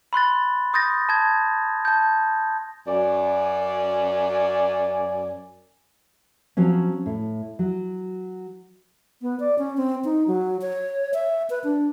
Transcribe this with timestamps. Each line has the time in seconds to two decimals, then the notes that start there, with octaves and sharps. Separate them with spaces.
0.13 B5 C6 F#6 A6
0.73 C6 D#6 G6 A6 A#6
1.09 A5 G#6
1.85 A5 G6
2.88 F#2 D5 G#5
6.57 F3 F#3 C4 C#4
7.06 A2
7.59 F#3
9.22 B3
9.40 D5
9.58 C#4
9.77 C4
10.05 D#4
10.28 F#3
10.61 C#5
11.14 E5
11.50 B4
11.64 D4